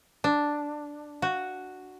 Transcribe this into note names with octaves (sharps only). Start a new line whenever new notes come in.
D4
F#4